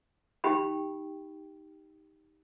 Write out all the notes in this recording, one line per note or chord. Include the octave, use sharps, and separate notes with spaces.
D#4 G4 G5 B5